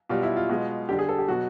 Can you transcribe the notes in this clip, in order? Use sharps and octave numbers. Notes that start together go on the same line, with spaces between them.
B2 G3 F4
E4
F4
B2 G#3
D3 G3 G4
G#4
A4
G4
B2 F#3 F#4